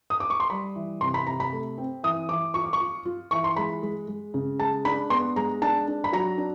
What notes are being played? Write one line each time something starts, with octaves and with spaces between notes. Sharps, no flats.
D#6
D6
C#6
C6
G3 B5
E3
C3 C6
B5
C3 A#5
B5
A3
C4
E3 D#6
E3 D6
F4 C#6
D6
C#6
F4
F4
E3 C#6
C6
G#3 B5
G#3
G#3
C#3
G#3 A5
D4 B5
B3 C6
G#3 A#5
D4 A5
D4
B5
F#3 A#5
D4